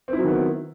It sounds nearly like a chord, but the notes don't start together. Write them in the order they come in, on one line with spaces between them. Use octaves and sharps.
C4 E4 F#3 D#3 B3